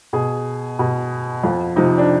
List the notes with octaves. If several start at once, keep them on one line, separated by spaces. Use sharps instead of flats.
B2 G#4
B2
F2 F4
C3 F3 D#4
D4